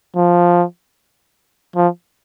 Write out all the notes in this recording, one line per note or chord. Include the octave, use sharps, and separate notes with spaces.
F3
F3